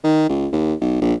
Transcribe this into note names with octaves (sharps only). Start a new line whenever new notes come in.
D#3
C#2
D#2
B1
A#1